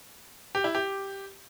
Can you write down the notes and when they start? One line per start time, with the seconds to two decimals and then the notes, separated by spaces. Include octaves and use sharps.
0.55 G4
0.64 E4
0.75 G4